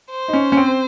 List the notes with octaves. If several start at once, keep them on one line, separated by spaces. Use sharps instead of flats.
C5
D#4
C#4
C#4
C4